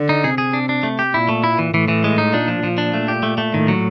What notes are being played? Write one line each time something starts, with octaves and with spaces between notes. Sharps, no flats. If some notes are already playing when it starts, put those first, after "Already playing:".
Already playing: D3
D#4
C3 G#4
G#4
D4
D4
A3
G4
A#2 E4
A3
E4
E3
A2 E3
E3
G#3
D#4
A#2 D4
F3
A#2 F3
D4
A3
G4
A3
A3
A2 D#3
F#3